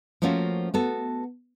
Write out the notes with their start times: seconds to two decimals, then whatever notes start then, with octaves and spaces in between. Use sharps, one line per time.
0.22 F3 A3 A#3 C#4 F4 F#4
0.74 B3 F#4 A4